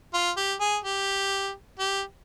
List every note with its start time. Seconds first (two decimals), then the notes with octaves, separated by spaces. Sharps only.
0.14 F4
0.37 G4
0.60 G#4
0.84 G4
1.79 G4